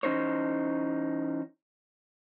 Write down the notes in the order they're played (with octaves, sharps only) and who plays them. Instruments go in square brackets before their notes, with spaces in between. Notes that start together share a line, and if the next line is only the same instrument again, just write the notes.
[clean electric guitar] E3 C#4 D#4 C5 C#5